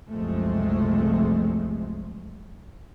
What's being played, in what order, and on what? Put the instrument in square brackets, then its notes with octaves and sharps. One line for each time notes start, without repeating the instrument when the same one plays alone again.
[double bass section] F#1 C2 C3 F3 G#3 A3